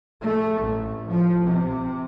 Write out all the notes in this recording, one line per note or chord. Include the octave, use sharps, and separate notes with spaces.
A3
A1
F3
C3